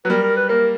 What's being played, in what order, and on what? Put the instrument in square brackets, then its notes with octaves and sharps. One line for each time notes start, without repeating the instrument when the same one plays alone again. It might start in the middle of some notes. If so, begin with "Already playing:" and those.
[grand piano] F#3 [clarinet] B4
[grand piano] G3 [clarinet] A#4
[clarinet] A#4
B4
[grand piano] A#3 [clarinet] A#4